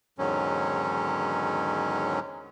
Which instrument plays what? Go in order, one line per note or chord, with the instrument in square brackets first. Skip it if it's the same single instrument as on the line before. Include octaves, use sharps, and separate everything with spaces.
[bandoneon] E2 G#2 D3 D#3 F#3 C#4